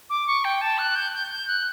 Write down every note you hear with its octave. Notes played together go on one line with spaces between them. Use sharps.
D6
C#6
G5
A5
F#6
G6
G6
G6
F#6